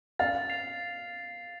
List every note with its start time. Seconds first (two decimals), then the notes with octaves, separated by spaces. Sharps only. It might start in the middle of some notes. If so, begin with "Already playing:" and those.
0.19 F5 A6
0.50 C7 F7